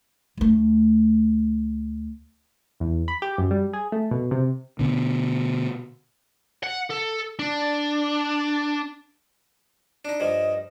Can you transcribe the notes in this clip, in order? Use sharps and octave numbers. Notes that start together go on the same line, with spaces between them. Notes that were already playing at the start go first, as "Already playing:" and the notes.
D2 A3
E2
B5
G4
F#2
G3
G#4
A3
B2
C3
B2 D3
F#5
A4
D4
D4 D#4
G2 F3 D#5